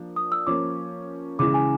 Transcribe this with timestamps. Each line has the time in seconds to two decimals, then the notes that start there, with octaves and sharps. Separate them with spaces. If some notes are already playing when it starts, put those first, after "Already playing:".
Already playing: F3 A#3 D4
0.16 D#6
0.32 E6
0.47 F3 A#3 C#4 D6
1.39 C#3 E3 G#3 D6
1.54 G#5